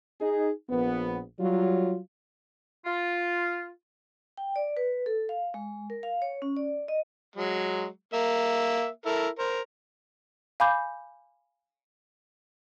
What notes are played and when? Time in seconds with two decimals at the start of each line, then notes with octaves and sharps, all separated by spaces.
0.21 D#4 G#4
0.70 A#1 B3
1.39 F#3 G3 F4
2.86 F4
4.37 G5
4.56 D5
4.77 B4
5.06 A4
5.29 F5
5.54 G#3
5.90 A#4
6.03 F5
6.22 C#5
6.42 C#4
6.57 D5
6.88 D#5
7.36 F#3 G#3
8.14 A#3 E5
9.06 E4 A4 A#4
9.39 A#4 C5
10.60 F5 G#5 B5 D6 G6